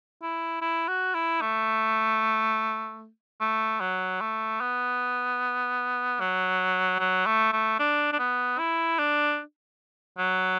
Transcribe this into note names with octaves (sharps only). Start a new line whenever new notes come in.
E4
E4
F#4
E4
A3
A3
F#3
A3
B3
F#3
F#3
A3
A3
D4
D4
B3
E4
D4
F#3